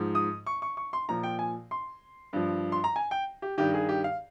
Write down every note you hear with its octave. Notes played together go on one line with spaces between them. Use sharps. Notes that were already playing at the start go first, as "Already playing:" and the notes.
Already playing: G#2 F3
D#6
C#6
C#6
C#6
C6
A#2 F3 A#5
G5
G#5
C6
G2 F3
C6
A#5
G#5
G5
G4
G2 D#3 G4
G#4
G4
F5